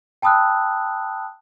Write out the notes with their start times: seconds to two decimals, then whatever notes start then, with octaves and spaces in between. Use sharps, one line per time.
0.22 G5 A5 B5 D#6 E6 F#6